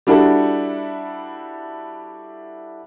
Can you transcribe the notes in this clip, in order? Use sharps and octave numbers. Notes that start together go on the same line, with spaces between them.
G3 D4 E4 F#4 A4